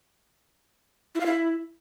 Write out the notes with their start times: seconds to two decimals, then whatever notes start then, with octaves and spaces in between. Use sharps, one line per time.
1.15 E4
1.20 F5
1.26 E4